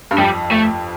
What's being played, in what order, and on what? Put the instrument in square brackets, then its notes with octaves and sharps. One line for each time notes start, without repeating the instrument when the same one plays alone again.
[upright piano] G2
[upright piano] F2 [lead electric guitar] G3
[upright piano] F2 [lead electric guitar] A3